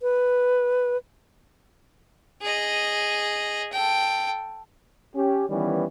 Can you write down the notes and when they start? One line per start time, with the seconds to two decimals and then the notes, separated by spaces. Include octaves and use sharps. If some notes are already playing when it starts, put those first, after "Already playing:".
0.01 B4
2.42 G#4 D#5
3.72 A4 G5
5.15 C#4 G4
5.50 D#3 E3 G3 B3 C#4